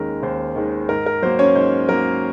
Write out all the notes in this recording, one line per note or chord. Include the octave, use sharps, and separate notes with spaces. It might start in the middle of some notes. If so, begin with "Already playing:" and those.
Already playing: D#2 D#3 G#3 C#4 A#4
D#2 C5
D#3 G#3
G#2 A#4
A#4
F#3 A#3 C5
C#4 C#5
G#2 C5
F#3 A#3 A#4